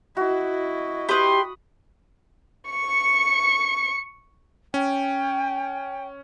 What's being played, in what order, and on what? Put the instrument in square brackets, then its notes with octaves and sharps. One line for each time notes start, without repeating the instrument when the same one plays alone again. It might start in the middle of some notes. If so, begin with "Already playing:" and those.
[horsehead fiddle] E4 D#5 [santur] F#4
[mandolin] G4 B4 [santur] B5 D#6 [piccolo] C6
[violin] C#6 C#7
[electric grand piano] C#4 [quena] G5